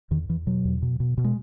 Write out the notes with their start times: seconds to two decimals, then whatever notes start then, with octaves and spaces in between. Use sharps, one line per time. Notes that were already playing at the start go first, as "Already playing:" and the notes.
0.11 E2 D#3
0.29 E2 E3
0.47 B2 F#3
0.65 E2
0.82 B2
1.00 B2
1.18 B2
1.24 G#3